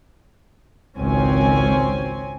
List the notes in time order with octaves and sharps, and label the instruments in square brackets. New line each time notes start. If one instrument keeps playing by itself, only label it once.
[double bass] G#1 C#2 [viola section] C4 C#4 G#5